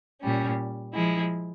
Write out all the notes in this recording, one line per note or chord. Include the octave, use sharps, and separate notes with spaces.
A#2 G3 C#4
F3 G#3 E4